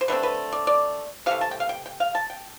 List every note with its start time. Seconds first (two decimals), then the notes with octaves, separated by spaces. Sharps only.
0.01 C5
0.08 D3 A3 C4 B4
0.23 B4
0.53 D5
0.67 D5
1.26 C3 E3 A3 F5
1.41 A5
1.51 G5
1.60 F5
1.69 G5
1.86 G5
2.00 F5
2.15 A5
2.30 G5